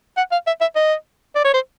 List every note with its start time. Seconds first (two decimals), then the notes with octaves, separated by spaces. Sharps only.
0.17 F#5
0.32 F5
0.47 E5
0.61 E5
0.76 D#5
1.35 D5
1.44 C#5
1.54 C5